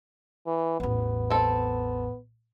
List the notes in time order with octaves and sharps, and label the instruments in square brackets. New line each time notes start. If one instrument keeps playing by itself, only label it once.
[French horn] E3
[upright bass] A1 E2 [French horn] B3
[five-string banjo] C4 A4